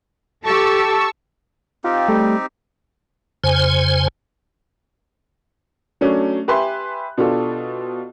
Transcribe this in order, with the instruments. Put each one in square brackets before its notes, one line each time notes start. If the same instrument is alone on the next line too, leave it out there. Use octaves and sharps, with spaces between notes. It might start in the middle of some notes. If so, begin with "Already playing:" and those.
[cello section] G4 A4 [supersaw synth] A5 C#6 E6
[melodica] C4 D#4 G4 [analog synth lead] F4
[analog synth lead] G3 [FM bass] A3
[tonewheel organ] F2 C#3 C5 G#5
[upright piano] F#3 A3 C#4 D4
G4 B4 E5 G#5 C6 F#6
B2 D4 F4 G4 A4